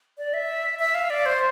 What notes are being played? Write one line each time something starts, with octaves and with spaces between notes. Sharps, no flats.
D5
E5
E5
F5
D5
C5